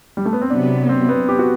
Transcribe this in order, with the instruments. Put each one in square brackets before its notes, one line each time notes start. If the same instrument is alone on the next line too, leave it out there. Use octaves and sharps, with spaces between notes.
[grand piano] G3
A3
B3
C4
[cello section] C3 F#3 B3 [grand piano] D4
[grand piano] C4
B3
G4
F#4